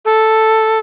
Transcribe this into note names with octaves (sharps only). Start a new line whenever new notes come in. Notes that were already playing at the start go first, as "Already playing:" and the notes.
A4